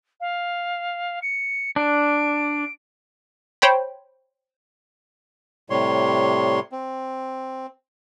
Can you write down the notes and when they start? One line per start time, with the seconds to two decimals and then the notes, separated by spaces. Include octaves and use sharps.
0.21 F5
1.22 C#7
1.76 D4 D7
3.62 C5 C#5 G5 B5
5.70 A2 C3 G3 C#5 C6
6.72 C4